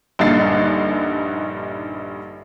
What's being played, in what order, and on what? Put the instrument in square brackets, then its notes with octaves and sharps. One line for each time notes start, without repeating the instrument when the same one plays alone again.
[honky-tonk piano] A#1 G2 D3 D#4 A6 C7